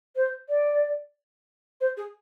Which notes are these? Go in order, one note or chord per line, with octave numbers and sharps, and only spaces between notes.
C5
D5
C5
G#4